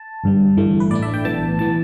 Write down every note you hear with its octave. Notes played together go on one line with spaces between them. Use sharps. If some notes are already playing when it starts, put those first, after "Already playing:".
Already playing: A5
G1 G2 G3
G1 G2 E3 A3
B4
A1 A2 A3 D4 D5
E5
G5
B1 A2 E3 B3 A5
E3 B3 A5